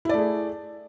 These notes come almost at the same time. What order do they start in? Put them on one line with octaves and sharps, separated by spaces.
E4 D5 A3 G#4